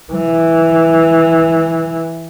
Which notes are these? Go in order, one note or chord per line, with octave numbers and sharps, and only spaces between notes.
E3